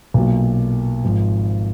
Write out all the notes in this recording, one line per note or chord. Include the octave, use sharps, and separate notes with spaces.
B1 A#2 F#3
G#1 G#2 F3